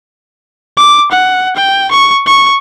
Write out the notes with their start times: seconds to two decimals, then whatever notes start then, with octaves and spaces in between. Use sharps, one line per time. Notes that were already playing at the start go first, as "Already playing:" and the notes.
0.77 D6
1.11 F#5
1.56 G5
1.91 C#6
2.26 C#6